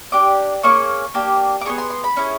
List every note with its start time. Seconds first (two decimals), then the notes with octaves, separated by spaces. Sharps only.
0.12 D4 G4 D6
0.63 A#3 C#4 G#4 C#6
1.14 A#3 D4 G4
1.61 D6
1.65 B3 E4 G#4 C#6
1.78 C6
1.90 C6
2.04 B5
2.17 C#4 E4 G#4